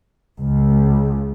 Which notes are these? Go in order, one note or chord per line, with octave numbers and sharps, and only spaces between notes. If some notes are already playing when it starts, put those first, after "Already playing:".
C#2